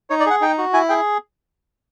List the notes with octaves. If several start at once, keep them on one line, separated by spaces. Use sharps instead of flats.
D#4 C#5
D5
G#4 F#5
D#4 G5
F#4
E4 G#5
G#4 G5